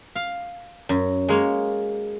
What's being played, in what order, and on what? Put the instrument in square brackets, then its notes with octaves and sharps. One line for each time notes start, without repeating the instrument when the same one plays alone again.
[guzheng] F5
F#2
G#3 A#3 C#5